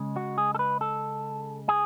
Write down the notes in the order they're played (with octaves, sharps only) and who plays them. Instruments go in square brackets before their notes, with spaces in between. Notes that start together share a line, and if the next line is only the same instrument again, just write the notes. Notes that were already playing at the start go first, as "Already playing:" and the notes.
Already playing: [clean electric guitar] C#3 G#3
F#4
G#4
A4
B4
A4
G#4